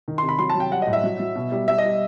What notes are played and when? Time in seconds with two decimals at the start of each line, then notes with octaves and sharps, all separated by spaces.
0.08 D#3
0.18 C6
0.23 C3
0.29 B5
0.39 F#3 C6
0.50 A5
0.55 F#3
0.60 G5
0.71 G3 F#5
0.82 D#5
0.87 A2
0.93 E5
1.04 F#3
1.20 F#3
1.36 B2
1.52 G3
1.68 G3 E5
1.78 D#5
1.84 G3